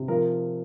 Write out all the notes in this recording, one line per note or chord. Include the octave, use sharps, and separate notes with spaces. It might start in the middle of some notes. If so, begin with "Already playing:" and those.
Already playing: C3
F3 A#4